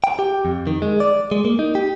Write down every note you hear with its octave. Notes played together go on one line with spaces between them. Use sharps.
G5
G4
F2
D#3
G#3
D5
G#3
A#3
D#4
G4